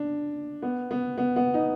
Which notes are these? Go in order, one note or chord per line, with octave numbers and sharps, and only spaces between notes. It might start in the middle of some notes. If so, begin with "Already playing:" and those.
Already playing: D4
B3
B3
B3
B3
D#4